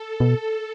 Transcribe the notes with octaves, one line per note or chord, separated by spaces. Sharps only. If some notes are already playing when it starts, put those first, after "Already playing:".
Already playing: A4
B2